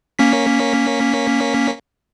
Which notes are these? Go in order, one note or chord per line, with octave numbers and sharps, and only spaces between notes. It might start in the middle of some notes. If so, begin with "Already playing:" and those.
A#3 C#4 B6